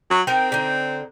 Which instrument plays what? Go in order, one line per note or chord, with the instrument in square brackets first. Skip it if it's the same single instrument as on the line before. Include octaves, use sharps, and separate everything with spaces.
[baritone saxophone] F#3
[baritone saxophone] C4 [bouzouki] D#4 A#4 G5
[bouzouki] D3 D#4